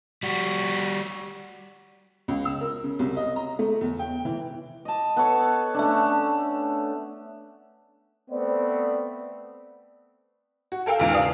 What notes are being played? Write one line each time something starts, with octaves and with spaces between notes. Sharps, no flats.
G3 F#4
C#2
E6
A#4
C#3
C2
D#5
A#5
A3
E2
G5
E3
D#5 A5
B3 A4 C#5
A3 C#4 D4
A3 B3 C4 C5 D5
F#4
A4 A#4 F5 G5 E6
E2 G#2 C#3 F4 F6 D7
D4 F5 D#6